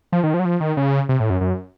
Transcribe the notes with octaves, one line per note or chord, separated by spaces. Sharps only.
F3
D#3
F3
F#3
F3
D#3
C#3
C3
A2
F#2
F#2